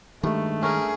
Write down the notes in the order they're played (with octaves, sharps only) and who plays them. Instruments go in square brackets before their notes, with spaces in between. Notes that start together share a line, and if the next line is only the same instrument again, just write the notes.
[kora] G2 [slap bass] D#3 G#3 [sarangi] A3
[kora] C#4 A#4 [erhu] G#4